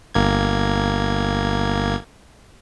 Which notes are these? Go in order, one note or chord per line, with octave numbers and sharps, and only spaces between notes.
G1 A#3 G#6